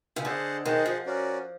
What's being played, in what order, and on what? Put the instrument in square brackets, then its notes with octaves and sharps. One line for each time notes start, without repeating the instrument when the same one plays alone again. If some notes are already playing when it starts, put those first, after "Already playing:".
[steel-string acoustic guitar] C#3
[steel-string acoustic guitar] D3 [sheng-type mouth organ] G#4 C5 D#5 F#5 A5
[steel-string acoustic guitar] D#3 [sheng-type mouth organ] G#4 C5 D#5 F#5 A5
[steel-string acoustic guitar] F3
[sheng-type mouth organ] C#4 F#4 A#4 D5